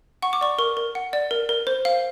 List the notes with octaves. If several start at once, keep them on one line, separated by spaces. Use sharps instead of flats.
F#5 C#6
D6
D5 C#6
A#4 C#6
A#4
F#5
D5
A#4
A#4
C5
F5